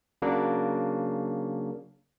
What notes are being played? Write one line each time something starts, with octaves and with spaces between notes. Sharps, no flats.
C#3 F#3 A#3 D4